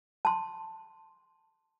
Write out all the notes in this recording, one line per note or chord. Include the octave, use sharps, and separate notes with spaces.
A5 C6